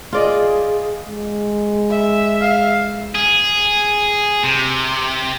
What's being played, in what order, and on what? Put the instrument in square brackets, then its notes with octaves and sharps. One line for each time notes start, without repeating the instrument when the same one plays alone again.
[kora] F4 D5 D#5 [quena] G#4
[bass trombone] G#3
[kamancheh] E5
[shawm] F5
[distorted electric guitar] G#4
C3